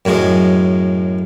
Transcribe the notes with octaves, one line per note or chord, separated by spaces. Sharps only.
F#2 A2 F#3 G#3 D#6